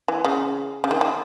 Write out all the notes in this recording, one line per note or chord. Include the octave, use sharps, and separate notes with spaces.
E3
C#3
C#3
D#3
D#3